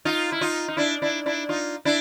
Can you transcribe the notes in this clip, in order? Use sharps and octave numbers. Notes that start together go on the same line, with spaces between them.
D#4 F4
E4
D#4 F4
D#4
D4 E4
D4 E4
D4 E4
D#4 F4
D4 E4